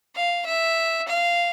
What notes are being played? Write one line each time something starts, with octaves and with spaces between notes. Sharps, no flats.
F5
E5
F5